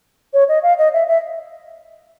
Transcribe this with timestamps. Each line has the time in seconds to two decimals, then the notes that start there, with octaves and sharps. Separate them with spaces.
0.34 C#5
0.49 D#5
0.63 F5
0.78 D#5
0.93 E5
1.08 E5